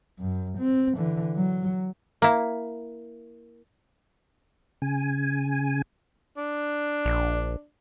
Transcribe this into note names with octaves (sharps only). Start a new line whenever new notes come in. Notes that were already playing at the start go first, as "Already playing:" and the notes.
F#2
C4
D3 E3
F#3
A#3 E4
C#3 G#5
D4
A#1